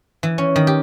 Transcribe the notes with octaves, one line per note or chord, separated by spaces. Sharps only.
E3
C#4
D#3
G4